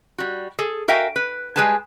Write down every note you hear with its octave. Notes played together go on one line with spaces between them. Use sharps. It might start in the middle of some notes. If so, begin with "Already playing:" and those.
G3 F#4
G#4 A4
F#4 A#4 E5 F5 G5 G#5
B4
G3 G#3 G#4 B4 G#5 A5